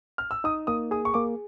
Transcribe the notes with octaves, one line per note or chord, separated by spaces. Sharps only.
F6
E6
D#4 D#6
A#3 D#6
G#4 D#6
C#6
A#3 D6